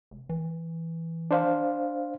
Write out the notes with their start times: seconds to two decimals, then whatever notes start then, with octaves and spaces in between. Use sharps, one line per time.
0.11 F1
0.29 E3
1.31 D4 C5 F5